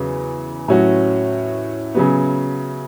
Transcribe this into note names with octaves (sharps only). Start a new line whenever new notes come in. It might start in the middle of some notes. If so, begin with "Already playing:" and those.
Already playing: E2 C#3 F#3
A2 F#3 C#4 F#4
C#3 F#3 B3